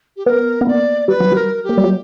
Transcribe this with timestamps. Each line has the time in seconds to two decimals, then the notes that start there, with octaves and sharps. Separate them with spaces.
0.17 G4
0.26 B3 A#4
0.61 B3
0.67 A#3 D5
1.08 G3 B4
1.20 F#3
1.32 G3 A#4
1.64 G4
1.69 A#3
1.78 G3
1.84 F#3